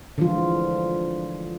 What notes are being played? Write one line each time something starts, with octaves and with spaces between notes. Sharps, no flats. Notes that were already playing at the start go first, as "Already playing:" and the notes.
D3 E3 F3 G#3 F4